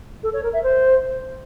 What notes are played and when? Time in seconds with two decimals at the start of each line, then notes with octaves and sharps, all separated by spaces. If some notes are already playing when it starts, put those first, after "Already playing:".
0.23 A4
0.33 C#5
0.43 A#4
0.53 E5
0.63 C5